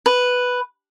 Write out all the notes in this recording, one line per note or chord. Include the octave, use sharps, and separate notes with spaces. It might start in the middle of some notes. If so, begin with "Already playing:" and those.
B4